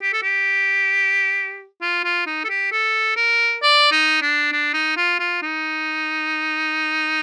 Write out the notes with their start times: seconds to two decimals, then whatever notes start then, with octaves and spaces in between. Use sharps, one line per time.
0.02 G4
0.13 A4
0.23 G4
1.82 F4
2.04 F4
2.27 D#4
2.44 A4
2.50 G4
2.72 A4
3.16 A#4
3.62 D5
3.92 D#4
4.22 D4
4.52 D4
4.74 D#4
4.97 F4
5.20 F4
5.42 D#4